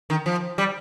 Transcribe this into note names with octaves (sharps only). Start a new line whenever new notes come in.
D#3
F3
G3